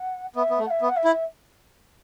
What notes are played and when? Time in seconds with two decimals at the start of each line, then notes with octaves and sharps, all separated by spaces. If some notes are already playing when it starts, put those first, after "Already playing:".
Already playing: F#5
0.35 B3 E5
0.50 B3
0.59 A3
0.66 F#5
0.70 E5
0.82 B3
0.88 F#5
0.96 E5
1.05 E4